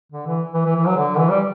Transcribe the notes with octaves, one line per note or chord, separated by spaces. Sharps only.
D3
E3
E3
E3
E3
F#3
D3
E3
G3